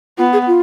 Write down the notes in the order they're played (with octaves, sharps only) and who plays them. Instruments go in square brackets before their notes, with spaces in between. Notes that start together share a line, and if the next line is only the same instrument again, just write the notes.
[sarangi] B3 [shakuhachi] F4
[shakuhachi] G#4
F4